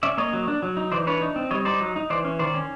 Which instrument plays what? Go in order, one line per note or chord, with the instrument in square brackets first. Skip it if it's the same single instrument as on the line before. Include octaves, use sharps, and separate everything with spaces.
[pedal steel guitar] C#4 D5 E5
A#3 C#5 D#5
F#3
D4
F#3
D#4
E3 C5 D5
D4 B4 C#5
D#4
C4
G3 C#5 D#5
D#4 C5 D5
F#3
D#4
E3 C5 D5
C#4
D#3 C5 D5
C#4